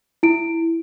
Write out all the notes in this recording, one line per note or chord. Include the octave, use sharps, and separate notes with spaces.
E4 D7